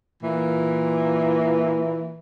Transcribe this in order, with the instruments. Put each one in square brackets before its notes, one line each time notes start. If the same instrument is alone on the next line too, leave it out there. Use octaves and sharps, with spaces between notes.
[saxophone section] A#2 E3